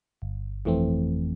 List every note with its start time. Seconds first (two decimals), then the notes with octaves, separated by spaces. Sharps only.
0.22 G1
0.65 F2 E3 A3 C4